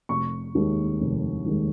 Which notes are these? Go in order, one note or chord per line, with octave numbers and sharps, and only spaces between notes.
F1 C#6
D#2 D#3 G#3
F1
D#2 D#3 G#3